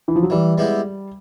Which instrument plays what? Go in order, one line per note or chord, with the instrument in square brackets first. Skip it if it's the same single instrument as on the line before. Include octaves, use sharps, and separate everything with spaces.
[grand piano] E3
F3
F#3
[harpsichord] E3 [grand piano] G3
[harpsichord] G#3 B3 E4 G4